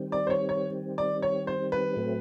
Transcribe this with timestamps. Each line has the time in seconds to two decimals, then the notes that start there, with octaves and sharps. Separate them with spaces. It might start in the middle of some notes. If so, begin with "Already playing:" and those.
Already playing: D#3 G3 C4
0.12 D5
0.27 C5
0.30 C#5
0.49 C#5
0.98 D5
1.22 C#5
1.47 C5
1.72 B4
1.96 A2 F#3 A3 C4